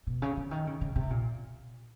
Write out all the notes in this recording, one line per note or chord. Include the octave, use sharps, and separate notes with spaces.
B2
C#3
D3
D#3
C#3
C#3
C3
A#2